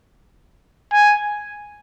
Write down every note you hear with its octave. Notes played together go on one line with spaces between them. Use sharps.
G#5